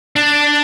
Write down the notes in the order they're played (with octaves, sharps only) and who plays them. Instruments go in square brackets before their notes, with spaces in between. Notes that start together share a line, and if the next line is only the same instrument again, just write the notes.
[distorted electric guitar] D4